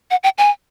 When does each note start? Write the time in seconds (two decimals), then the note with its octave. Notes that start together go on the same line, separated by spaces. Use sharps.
0.11 F#5
0.24 G5
0.38 G#5